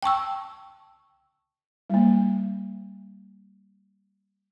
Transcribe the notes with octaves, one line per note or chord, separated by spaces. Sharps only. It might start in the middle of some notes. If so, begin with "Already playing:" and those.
G5 A5 C#6 E6
G3 A#3